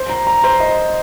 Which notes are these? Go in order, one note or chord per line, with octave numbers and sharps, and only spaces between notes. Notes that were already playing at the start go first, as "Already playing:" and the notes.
Already playing: C5
A#5
A#5
C5
D#5